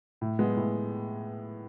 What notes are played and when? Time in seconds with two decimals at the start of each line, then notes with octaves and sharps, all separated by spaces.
0.21 A2
0.39 G#3 B3
0.57 A2